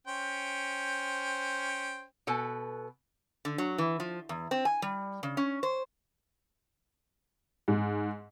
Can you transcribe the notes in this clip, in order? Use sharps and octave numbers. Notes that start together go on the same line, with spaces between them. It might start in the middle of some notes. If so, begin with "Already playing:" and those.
C#4 C5 G5
B2 A4 B4 G#5
D3
F#3
E3
F3
E2
C4
G#5
G3
C#3
C#4
C5
G#2